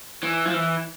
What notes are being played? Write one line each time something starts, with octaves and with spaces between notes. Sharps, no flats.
E3
F3
E3